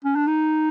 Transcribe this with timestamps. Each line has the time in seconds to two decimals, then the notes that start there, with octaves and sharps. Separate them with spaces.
0.04 C#4
0.16 D4
0.27 D#4